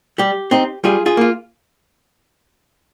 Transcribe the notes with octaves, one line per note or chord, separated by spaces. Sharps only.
G3 G4
C4 D#4
G3 F4 G#4
F4 G#4
A#3 F4